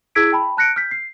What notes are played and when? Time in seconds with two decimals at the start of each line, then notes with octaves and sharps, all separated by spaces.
0.15 E4 G#4 E6 G#6 B6 D7
0.32 G5 A5 B5
0.57 A5 F#6 A#6 C#7 D7
0.76 F6 G6 B6
0.91 C7